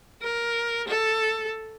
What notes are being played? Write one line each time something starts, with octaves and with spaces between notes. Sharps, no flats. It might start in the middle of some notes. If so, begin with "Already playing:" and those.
A#4
A4